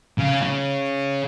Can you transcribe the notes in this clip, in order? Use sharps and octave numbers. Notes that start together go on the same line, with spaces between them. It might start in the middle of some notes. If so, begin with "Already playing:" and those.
C#3
C#3